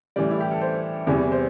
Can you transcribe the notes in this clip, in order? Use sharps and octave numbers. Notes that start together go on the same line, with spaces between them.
A2 E3 G3 D5
E4
G4
A4
C5
E2 C3 E3 G3
C5